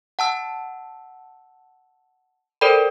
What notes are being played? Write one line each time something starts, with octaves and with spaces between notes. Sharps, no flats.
F#5 A5 E6
A4 A#4 C5 D5 G5 B5